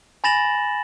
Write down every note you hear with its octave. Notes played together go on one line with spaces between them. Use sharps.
G#5 B5 A6 A#6 E7 F#7